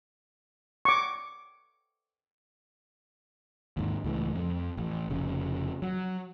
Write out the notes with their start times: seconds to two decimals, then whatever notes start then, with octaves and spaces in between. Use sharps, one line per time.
0.85 C#6 D6
3.77 D#2 G#2
4.04 C#2 A2 D#3 E3
4.35 F2
4.77 A1
5.10 F1 C#3
5.82 F#3